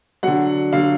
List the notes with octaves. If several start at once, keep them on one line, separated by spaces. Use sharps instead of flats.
D3 F#3 F#5
D3 F#3 F5